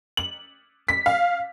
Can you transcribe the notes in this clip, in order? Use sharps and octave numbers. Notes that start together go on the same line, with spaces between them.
F#7
B6
F5